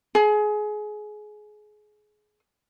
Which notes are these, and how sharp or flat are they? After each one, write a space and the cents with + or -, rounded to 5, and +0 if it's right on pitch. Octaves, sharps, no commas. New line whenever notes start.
G#4 +25